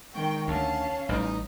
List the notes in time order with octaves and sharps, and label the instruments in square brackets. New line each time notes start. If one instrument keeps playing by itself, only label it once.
[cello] D#3 G#3 [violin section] G5 [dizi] C#6
[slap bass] D2 [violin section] C#4 [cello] F5 [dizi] A5
[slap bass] A1 G3 [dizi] D#4